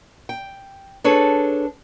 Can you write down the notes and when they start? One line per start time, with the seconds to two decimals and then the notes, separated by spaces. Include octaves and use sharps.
0.29 G5
1.04 D4 G#4 A4 B4 C#5